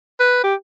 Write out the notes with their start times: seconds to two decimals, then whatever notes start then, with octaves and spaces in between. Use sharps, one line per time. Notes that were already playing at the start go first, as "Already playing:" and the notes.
0.20 B4
0.44 G4